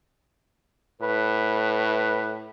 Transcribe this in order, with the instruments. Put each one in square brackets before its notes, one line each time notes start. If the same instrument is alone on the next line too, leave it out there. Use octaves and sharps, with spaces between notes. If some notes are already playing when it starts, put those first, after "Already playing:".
[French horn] A2 [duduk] B4